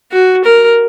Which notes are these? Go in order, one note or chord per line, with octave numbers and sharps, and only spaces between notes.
F#4
A#4